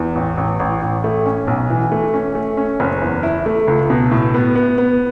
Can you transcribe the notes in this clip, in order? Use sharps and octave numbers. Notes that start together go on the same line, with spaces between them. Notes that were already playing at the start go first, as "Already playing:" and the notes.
Already playing: E2
A1
A1
A1
A1
A3
C#4
B1
E3
A3
C#4
A3
C#4
F#1
E2
E4
A3
C#2
B2
A2
B3
B3
B3